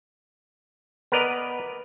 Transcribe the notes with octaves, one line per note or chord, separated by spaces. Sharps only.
B3 A#4 B4 D5 D#5